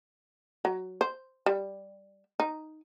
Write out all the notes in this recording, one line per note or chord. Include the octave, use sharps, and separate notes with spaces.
F#3
C5
G3
D#4